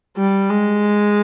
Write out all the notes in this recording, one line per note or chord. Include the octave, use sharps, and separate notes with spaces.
G3
G#3